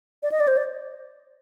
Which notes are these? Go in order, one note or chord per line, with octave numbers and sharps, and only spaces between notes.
D5
D#5
D5
C5
D5